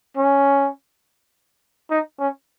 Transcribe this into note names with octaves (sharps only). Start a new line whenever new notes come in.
C#4
D#4
C#4